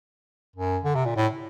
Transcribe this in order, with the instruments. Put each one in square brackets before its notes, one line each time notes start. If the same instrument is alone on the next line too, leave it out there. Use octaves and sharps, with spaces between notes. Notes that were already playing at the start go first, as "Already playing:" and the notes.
[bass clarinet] F#2
D3
C3
A#2
A2